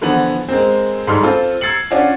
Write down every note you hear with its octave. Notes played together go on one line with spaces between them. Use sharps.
D3 E3 F3 B3 F#7
G#3 A#3 C4
G#2 G3 A4 C6 F6
C4 F4 A4
E6 G#6 A6 C7 C#7 F#7
C#4 D4 F4 F#4